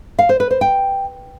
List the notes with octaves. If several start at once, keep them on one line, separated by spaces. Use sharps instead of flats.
F5
C5
B4
C5
G5